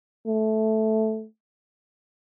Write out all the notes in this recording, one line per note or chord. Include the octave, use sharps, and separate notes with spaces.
A3